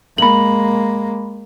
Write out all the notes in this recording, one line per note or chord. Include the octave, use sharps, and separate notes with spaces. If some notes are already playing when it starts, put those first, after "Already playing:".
G#3 A#3 B5 F#7